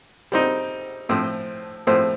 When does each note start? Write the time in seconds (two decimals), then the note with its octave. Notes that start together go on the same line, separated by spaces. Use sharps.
0.32 G3 C4 D#4
1.09 A2 F3 C4
1.87 A2 F3 C4